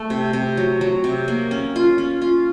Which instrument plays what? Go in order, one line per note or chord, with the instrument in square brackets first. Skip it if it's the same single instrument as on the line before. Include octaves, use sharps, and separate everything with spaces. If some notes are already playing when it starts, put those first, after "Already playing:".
Already playing: [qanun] A3
C3
C3
F#3
F#3
C3
A#3
C#4
F4
C#4
F4